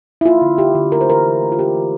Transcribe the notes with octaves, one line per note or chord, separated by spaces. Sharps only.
E4
A#3 F4
D3
D3 G4
D3
A3 A#4
C5
E3 A#4
E3
A3
F4
A#3 G4
E3